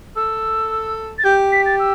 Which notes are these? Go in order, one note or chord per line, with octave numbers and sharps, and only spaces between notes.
A4 E6
A6
G4 G6
B6
A6
E6